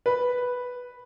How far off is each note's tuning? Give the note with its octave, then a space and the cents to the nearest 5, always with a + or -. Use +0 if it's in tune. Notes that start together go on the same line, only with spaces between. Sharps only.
B4 +0